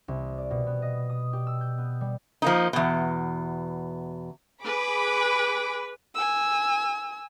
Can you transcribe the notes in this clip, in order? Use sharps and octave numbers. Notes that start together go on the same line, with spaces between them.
C2
D5
B2
B3
D#5
D#6
G4
E6
G6
B3
G3
F3 A#3 D#4
E2 B2
G#4 B4 B5 D6
G#5 E6